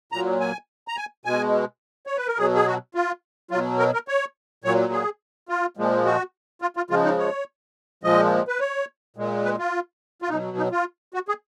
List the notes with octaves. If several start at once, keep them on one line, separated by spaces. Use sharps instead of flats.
A#2 F#3 A#5
G#5
A#5
G#5
B2 G#3 G#5
C#5
B4
A#4
B2 F#3 G#4
G#4
F#4
F4
B2 F#3 F4
A#4
A#4
C#5
A#2 F#3 C#5
G#4
F4
A#2 F3 G#3
F#4
F4
F4
C#3 F3 G#3 F4
D#4
C#5
A#2 F3 G#3 D#5
B4
C#5
A#2 G#3
B4
F4
F4
B2 F#3 D#4
D#4
F4
F#4
G#4